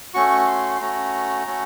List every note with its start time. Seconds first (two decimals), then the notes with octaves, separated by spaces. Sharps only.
0.14 A3 C#4 F#4 C#6
0.47 C6
0.76 C6
0.81 A3 C#4 F#4 A#5
1.47 A3 C#4 F#4